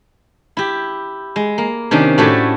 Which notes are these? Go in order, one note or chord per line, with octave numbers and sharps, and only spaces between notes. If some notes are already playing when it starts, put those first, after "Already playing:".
E4 G4
G#3
A#3
C3 D#3 C#4 D4
A2 A3 F#4 G4 A4 C#5